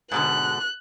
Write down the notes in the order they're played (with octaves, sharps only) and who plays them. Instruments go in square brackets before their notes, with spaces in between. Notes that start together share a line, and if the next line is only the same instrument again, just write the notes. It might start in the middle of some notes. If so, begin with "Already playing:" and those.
[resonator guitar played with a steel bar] G#2 B2 D3 [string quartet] F#6